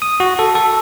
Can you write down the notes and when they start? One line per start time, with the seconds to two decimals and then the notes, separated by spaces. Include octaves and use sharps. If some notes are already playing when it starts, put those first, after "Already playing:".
0.02 D#6
0.20 F#4
0.39 A4
0.55 A4